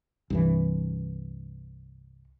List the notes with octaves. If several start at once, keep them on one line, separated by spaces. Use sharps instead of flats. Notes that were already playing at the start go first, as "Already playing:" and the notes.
C2 G2 E3